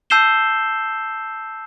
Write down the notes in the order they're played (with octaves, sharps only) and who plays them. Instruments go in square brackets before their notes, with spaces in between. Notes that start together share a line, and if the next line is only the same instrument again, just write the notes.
[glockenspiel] A5 E6 G6 C7 E7 G7